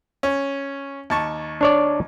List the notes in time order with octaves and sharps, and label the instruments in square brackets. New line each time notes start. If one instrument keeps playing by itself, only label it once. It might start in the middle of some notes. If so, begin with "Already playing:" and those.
[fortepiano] C#4
D#2 A5 C#6
[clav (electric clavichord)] D4 C#5 D5